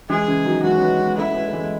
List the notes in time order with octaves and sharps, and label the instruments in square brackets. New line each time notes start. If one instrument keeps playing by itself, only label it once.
[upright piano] E3 G#3 [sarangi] G#4
[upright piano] C#3 E3
D#3 F#3
[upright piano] E3 G#3 [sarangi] F#4
[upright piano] C#4
G#3 B3
G#3 B3
[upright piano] A3 C#4 [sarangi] E4
[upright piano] C#4
G#3 B3
A3
E3 G#3